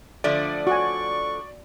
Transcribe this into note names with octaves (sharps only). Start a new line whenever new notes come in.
D3 F3 A3 D5
F#4 G#5 C#6